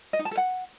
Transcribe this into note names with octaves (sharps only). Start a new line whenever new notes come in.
D#5
D#4
A5
A4
F#5